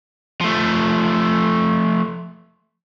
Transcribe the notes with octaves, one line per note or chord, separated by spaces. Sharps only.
F3 A3